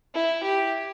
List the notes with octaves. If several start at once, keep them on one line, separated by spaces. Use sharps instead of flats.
E4
G4